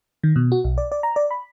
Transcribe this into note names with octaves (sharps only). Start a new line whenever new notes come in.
D#3
B2
F#4
B1
D5
D5
A#5
D5
B5